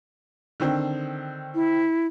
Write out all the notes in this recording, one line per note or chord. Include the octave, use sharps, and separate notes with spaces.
D3 D#3 C4
E4